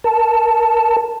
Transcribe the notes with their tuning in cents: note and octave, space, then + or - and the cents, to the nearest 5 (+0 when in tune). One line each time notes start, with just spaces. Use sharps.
A#4 +0 A5 +5